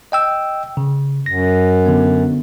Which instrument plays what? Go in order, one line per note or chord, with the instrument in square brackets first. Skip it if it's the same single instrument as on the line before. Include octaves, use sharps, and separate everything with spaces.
[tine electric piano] D#5 G5 E6
C#3
[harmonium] F#2 [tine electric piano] A#6
[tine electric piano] D3 B3